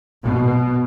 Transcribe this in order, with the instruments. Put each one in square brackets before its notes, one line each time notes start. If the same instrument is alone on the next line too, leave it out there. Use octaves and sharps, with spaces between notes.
[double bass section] B2